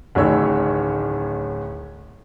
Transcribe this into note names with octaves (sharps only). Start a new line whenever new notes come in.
D1 A1 D#3 C#5 E6